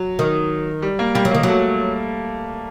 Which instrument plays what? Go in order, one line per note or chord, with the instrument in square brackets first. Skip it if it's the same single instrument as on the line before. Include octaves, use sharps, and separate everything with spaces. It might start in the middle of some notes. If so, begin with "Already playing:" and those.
Already playing: [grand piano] F#3
[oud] D#3
[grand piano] G3
A#3
[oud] G3 [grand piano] A#3
[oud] F#3
[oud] D#3 [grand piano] A#3
[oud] F#3 [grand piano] A3